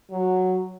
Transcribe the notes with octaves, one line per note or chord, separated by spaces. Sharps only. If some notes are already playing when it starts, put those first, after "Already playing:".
F#3